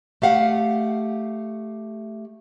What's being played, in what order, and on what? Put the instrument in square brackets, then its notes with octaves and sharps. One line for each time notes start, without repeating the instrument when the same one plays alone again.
[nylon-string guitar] A3 G4 F5 F#5